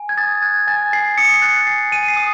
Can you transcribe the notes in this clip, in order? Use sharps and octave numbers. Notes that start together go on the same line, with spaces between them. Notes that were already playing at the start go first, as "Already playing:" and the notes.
Already playing: G#5
G#6
D#6 A6
F#6 G#6
G#5 A6
G#5 C7
D#6 C#7
C7
F#6 A6
G#5 C7
G#5 D#7
C7
D#6